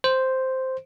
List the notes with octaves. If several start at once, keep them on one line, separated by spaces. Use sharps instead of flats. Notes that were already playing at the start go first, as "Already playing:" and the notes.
C5